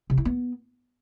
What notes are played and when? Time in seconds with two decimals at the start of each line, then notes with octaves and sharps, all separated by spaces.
0.10 C3
0.18 E4
0.25 B3